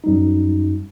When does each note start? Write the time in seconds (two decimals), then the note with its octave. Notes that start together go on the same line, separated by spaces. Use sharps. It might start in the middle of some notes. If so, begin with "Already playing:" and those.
0.04 F#2 G3 D#4